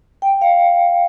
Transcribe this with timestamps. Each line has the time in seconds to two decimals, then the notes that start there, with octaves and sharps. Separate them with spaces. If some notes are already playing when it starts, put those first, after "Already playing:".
0.22 G5
0.41 F5